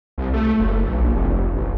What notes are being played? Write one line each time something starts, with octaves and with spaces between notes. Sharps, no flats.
C2
A3
F#1
B1
A#1
F1
A1